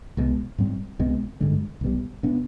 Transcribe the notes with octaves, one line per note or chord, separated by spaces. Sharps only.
C2 B2 G#3
G#2 G3 C4
C2 B2 G#3 C4
G#1 G2 D3 G#3
B1 B2 G3
B2 B3 D4